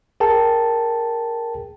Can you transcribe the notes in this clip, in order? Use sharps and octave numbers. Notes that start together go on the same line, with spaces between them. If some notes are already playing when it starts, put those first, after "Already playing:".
G#4 A#4 G5 A5